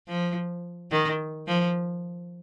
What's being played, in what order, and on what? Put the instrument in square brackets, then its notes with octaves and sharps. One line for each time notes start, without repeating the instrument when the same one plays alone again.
[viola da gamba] F3
D#3
F3